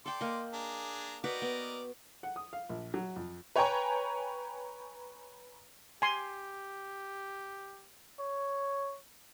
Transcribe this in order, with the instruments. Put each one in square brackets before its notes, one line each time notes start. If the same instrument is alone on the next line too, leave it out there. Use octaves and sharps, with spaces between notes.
[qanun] A4 G5 [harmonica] D5 C6
[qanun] A#3 D#5
[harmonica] D4 G#4 A#5
[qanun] F#4 B4 G5 [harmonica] A#4 D5 D#5
[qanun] B3
[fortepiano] F#5
D#6
F5
A#1
F#3
F2
[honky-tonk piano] B4 C#5 G5 G#5 A#5 C#6
[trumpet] G4 [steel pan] G#5 C6
[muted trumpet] C#5